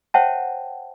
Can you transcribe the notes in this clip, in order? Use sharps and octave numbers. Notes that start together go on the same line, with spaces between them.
C5 C#5 E5 F#5 G5 A5